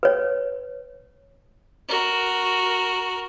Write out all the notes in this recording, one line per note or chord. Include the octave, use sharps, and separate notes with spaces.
B4 C#5
F#4 A#4